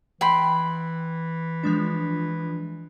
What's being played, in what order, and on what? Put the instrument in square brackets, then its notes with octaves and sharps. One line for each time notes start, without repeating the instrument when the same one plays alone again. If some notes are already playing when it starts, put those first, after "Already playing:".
[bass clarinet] E3 [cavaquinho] G5 B5 C6
[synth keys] F3 G#3 D4